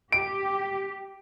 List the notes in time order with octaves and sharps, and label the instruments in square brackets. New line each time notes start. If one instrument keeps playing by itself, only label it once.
[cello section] G4 [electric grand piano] D7